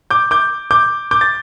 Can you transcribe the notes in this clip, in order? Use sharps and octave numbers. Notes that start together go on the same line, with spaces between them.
D6 G6
D6 G6
D6 G6
D6 G6
A6